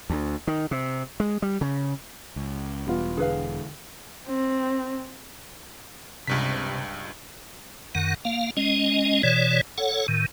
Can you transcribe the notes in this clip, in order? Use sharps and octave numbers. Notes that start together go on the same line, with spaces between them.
D2
D#3
C3
G#3
G3
C#3
C#2
E1 G3 B3 F4
D3 G#4 B4 F5
C4
C#2 G2 C3 B6
F#2 D#3 F#5
A#3 F5
G#3 C#4 D#5
B2 E3 C#5 D5
A4 C#5 F#5
A2 D#3